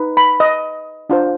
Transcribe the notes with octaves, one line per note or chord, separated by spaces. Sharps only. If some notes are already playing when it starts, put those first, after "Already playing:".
Already playing: D#4 B4
B5
D#5
D4 F4 C5